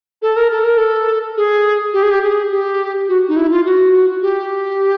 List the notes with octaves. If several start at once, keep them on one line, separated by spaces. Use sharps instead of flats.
A4
A#4
A4
A#4
A4
G#4
G4
G#4
G4
G#4
G4
F#4
D#4
E4
F4
F#4
G4